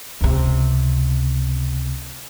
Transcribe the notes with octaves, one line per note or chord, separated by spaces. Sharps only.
C#2 C3